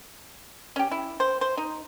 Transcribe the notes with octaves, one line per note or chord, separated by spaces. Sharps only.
C#4 G4
E4
C5
C5
D#4